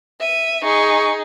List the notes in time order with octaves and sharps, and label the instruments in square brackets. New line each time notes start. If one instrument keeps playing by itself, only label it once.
[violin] E5 D#7
[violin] D#4 G#4 [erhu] C#6